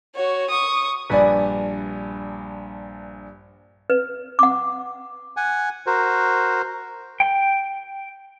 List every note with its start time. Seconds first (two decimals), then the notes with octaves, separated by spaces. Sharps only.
0.15 F#4 C#5
0.50 C#6 D#6
1.10 A#1 G2 B4 D5 G#5
3.90 B4
4.39 F#5 D6
5.37 F#5 G#5
5.86 F#4 A#4 C5
7.20 G5